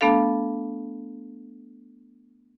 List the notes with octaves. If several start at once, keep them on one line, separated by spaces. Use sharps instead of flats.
A3 B3 D4 A4 F5